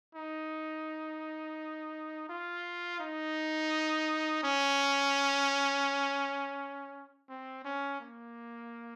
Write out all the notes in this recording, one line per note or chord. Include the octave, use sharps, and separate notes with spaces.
D#4
F4
D#4
C#4
C4
C#4
A#3